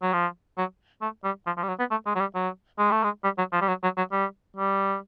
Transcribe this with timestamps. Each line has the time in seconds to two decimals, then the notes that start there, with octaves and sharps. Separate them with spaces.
0.02 F#3
0.13 F3
0.58 F#3
1.01 A3
1.24 G3
1.46 F3
1.57 F3
1.63 G3
1.68 F#3
1.79 B3
1.91 A3
2.06 G#3
2.15 F#3
2.20 G3
2.35 F#3
2.79 G#3
2.91 A3
3.04 G#3
3.24 G3
3.38 F#3
3.52 F3
3.61 G3
3.68 F#3
3.83 F#3
3.97 F#3
4.12 G3
4.56 G3